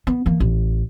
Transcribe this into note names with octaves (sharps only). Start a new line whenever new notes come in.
B3
E3 A#3
A1